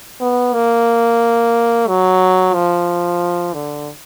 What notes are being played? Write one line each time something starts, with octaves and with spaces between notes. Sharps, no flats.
B3
A#3
F#3
F3
D3